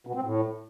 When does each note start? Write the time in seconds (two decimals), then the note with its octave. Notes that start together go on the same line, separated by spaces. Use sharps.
0.07 B2
0.15 C4
0.23 A2